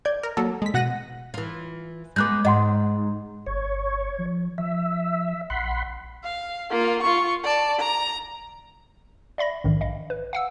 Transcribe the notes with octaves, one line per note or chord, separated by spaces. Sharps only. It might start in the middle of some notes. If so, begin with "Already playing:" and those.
D5 G6 G#6
A#4
F#3 A#3 A4
G#3 B6
B2 F#5 F#6 A#6 D#7
E3 F4
G#3 A#3 B3 D6 F#6 G6
G#2 D#5 F#5 C6
G1 C#5
F3
F3 E5
A#1 F#5 B5 C6
F5
A#3 F4
F4 C#6
D5 A5
A#5
D5 E5 B5 A#6
A#1 G#2 D#3
D#5 F5
B4
F5 F#5 E6